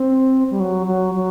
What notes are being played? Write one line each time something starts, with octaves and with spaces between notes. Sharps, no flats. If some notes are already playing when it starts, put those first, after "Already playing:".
Already playing: C4
G3
F#3
F#3
F#3